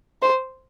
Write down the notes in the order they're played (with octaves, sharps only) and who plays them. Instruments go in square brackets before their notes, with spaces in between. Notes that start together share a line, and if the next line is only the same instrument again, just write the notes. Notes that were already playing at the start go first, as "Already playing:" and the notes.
[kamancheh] C5